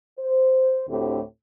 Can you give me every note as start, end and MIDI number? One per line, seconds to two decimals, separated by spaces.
0.19 0.81 72
0.87 1.20 38
0.87 1.20 45
0.87 1.20 50
0.87 1.20 60
0.87 1.20 64
0.87 1.20 67